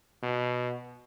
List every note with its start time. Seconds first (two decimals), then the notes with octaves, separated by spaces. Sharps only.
0.23 B2